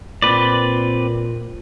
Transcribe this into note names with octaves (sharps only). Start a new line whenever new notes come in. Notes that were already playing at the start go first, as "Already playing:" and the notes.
A#2 C4 B4 D5